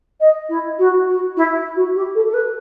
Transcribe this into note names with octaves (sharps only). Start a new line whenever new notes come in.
D#5
E4
F#4
F#4
E4
F#4
G4
A4
A4
B4